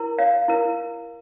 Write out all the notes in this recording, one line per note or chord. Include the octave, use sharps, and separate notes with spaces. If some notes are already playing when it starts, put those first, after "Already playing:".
Already playing: E4 A#4
F5
E4 A#4